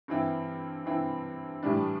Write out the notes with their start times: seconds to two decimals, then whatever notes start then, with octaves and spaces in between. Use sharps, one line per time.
0.08 G2 E3 C4 E4
0.86 G2 E3 C4 E4
1.63 A2 E3 G3 D4